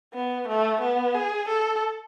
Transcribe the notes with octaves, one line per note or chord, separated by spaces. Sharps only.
B3
A3
B3
G#4
A4